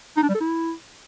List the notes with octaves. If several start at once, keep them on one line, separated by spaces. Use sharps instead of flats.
D#4
D4
G3
A4
E4